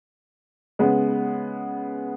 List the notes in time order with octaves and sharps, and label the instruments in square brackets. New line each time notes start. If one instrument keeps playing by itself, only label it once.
[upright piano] C#3 G#3 B3